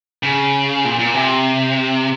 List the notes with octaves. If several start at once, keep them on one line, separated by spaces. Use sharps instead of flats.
C#3
A#2
A#2
C3